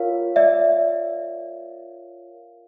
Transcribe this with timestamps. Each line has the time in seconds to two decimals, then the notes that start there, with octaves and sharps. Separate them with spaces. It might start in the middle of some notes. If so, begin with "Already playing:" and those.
Already playing: F4 A#4 C#5 F5
0.36 D5 E5